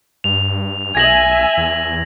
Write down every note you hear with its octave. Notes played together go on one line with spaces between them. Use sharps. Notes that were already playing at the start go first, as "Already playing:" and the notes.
G2 F7
B1 E5 G#5 G#6 A#6 F#7
E2